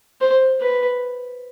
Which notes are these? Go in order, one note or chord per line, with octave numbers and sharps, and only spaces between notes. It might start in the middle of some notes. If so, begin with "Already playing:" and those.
C5
B4